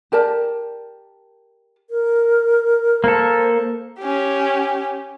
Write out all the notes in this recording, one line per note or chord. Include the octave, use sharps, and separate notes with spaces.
G4 A#4 D5 A5
A#4
A#3 A4 C5
C#4 G4